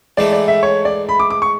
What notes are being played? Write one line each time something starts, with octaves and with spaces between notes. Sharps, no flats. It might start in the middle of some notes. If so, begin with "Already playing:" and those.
G#2 E3 A3 D5
D5
E5
C#5
D5
B5
D6
D6
C#6